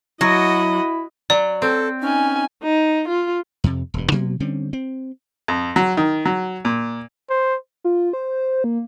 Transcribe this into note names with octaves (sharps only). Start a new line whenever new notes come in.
F#3 E4 F#4 D#5
F#3 D5
C4 A4
C#4 D#4 G#5
D#4
F4
F2 C3
E1 G2
B2 F#3 A#3 B3
D3 G3 C4 C#4
C4
F2
F#3
D#3
F#3
A#2
C5
F4
C5
A#3